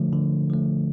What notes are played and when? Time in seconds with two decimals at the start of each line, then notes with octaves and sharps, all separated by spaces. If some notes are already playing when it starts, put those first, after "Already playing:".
Already playing: D3 F3 A3
0.13 D3
0.50 F3 A3